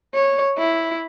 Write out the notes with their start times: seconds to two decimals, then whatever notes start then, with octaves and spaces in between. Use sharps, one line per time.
0.15 C#5
0.58 E4